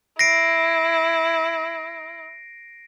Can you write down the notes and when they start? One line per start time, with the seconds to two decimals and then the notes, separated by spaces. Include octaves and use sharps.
0.19 E4 A#6 C7 D7